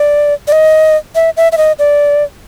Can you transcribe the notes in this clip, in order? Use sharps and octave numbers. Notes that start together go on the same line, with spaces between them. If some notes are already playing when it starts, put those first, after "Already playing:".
Already playing: D5
D5
D#5
E5
E5
E5
D#5
D5